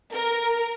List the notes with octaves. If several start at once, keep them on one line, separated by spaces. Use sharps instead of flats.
A#4